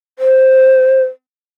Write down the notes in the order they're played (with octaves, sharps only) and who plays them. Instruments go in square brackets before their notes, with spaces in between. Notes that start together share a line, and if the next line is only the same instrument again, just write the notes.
[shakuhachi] C5